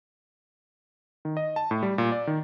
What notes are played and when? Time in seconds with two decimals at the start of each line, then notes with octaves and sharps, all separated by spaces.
1.25 D#3
1.37 D#5
1.56 A5
1.71 A2
1.83 G3
1.98 A#2
2.12 D5
2.27 D#3